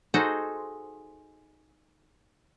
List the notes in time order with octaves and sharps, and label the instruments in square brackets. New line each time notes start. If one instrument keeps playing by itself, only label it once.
[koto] D#4 F#4 G#4 A4 C5